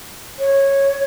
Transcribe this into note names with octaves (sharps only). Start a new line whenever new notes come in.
C#5